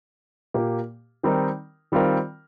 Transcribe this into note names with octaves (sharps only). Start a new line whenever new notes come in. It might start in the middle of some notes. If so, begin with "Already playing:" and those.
A#2 A#3 G4
D#3 G3 C4 D#4 A#4
D#3 G3 C4 F4 A#4